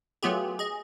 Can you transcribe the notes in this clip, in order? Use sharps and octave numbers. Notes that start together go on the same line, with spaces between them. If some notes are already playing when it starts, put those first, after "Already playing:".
F#3 A3 B3 F4 G4 G#4
G#4 D#5